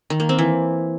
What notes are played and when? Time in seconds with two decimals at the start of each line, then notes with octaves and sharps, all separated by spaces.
0.10 D#3
0.20 A#3
0.29 C4
0.38 E3